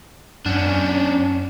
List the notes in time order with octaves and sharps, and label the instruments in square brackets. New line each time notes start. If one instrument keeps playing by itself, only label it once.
[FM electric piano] F#2 [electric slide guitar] C#4 D4